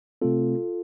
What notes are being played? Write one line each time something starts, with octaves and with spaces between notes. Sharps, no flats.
C3 A3 C4 F4 A4